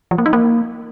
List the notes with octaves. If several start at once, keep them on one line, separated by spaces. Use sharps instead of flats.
F3
A#3
D#4
A#3